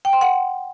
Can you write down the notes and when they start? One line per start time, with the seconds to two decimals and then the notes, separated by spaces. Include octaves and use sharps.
0.05 G5
0.13 C6
0.21 F#5